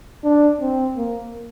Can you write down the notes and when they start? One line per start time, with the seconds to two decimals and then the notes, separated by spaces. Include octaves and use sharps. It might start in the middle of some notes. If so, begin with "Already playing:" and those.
0.24 D4
0.61 C4
0.98 A#3